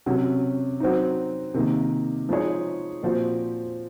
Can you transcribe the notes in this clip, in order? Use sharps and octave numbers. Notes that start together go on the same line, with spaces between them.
C3 F#3 C#4
F#3 C4 D#4
C3 D#3 A#3
F3 G#3 D#4 G#4 C#5
A#2 F3 C4 F#4 C5